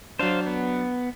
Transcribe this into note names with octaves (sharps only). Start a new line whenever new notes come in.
F#3 D4 C5 F5
B3